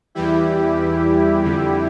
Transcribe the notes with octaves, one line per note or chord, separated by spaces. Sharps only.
E2 E3 G3 E4 G4
F2 D3 G3